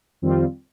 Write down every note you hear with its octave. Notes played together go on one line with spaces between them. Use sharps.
F2 D#3 G3 C4 F4